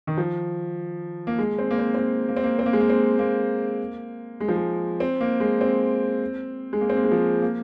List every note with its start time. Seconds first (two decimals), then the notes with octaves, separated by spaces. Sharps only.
0.07 D#3
0.17 F3
1.27 A#3
1.38 G#3
1.59 C4
1.71 A#3
1.79 C4
1.94 C4
1.99 A#3
2.29 A#3
2.37 C4
2.44 A#3
2.59 C4
2.66 A#3
2.73 G#3
2.81 A#3
2.90 C4
3.19 A#3
4.40 G#3
4.48 F3
4.56 G#3
5.00 C4
5.21 A#3
5.40 G#3
5.61 C4
6.73 G#3
6.81 A#3
6.90 C4
6.97 A#3
7.04 G#3
7.11 F3
7.42 A#3